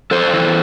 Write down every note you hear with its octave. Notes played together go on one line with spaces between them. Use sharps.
F2 A4 C5
E3